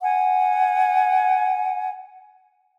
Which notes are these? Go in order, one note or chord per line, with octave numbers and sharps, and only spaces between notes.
F#5 G#5